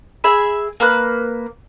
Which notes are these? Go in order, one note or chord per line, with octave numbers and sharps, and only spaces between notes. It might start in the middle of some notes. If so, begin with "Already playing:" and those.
G#4 E5 B5
A#3 B4 F#6